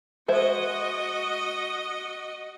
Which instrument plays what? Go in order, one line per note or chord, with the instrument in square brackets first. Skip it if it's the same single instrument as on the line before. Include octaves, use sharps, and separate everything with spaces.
[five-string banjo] G#3 C5 E5 [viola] F#4 D#5